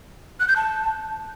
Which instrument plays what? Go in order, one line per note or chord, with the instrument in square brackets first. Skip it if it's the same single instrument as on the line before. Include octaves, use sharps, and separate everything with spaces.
[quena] F#6
G6
A5